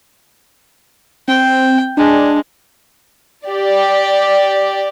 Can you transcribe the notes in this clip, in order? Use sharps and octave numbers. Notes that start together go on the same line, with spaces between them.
C4 G5
G#3 D4
G4 D5